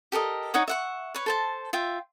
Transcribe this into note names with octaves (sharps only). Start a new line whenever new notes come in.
G4 A4 A#4 D#5
D#4 C#5 F#5 D#6
E5 F#5 C#6
B4 C#5
A4 C5 A5
F4 E5 G5